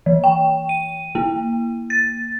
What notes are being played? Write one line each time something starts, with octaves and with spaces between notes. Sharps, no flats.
E3
G5
D#7
A#3
A6